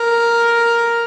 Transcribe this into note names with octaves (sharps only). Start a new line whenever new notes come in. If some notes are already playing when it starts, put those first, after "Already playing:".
Already playing: A#4